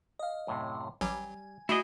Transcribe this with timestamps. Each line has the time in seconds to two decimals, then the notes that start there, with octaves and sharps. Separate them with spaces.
0.19 D#5 F5
0.47 F#2 A2 C3
1.01 A1 F#3 G3 G#5
1.69 A3 E4 F#4 G#4 D#5